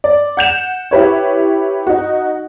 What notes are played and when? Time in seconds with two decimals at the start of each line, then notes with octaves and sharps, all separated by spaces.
0.04 D5
0.37 F#5 G6 E7
0.91 E4 G4 B4 C#5
1.87 D#4 F#4